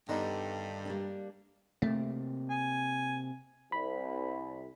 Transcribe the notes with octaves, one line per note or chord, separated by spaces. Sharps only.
G2 D3 D#3 B3 D#4
G3 A#3 D4
C3 A3 A#3
G#5
C2 B5